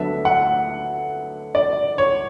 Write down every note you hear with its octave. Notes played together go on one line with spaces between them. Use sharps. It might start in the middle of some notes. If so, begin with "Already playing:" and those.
Already playing: D2 D3 F#3 B3 D4 E5
F#5
D5
C#5